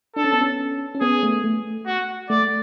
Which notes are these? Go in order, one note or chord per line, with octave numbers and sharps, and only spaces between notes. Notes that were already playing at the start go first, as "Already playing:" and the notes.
D4 A4
C#4
B3
C#4
C#4
B3 G#4
A3
A3
F#4
A3 D5